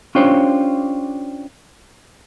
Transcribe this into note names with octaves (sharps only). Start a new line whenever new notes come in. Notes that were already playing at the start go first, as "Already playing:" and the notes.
C#4 D4 F4 G4 C5 C#5